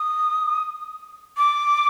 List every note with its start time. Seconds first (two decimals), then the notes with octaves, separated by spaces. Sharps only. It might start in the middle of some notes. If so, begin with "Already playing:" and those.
Already playing: D#6
1.37 D6